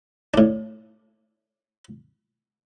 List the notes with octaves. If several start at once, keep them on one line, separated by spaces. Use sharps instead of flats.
A2 D4